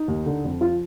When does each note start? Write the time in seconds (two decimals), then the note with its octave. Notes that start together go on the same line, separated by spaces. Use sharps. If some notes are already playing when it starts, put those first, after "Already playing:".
Already playing: D#4
0.08 D#2
0.26 D3
0.44 F2
0.61 F3 F4